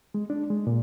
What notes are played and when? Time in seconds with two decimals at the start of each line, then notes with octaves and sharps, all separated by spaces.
0.14 G#3
0.30 D4
0.50 G#3
0.67 A#2